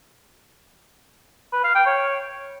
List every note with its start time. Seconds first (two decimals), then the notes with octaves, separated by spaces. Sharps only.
1.52 B4
1.64 F5
1.75 G5
1.86 C#5